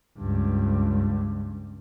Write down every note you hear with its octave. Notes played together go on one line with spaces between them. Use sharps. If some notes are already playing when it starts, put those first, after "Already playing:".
C#2 G2